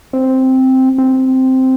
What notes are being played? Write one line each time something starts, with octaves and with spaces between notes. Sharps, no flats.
C4
C4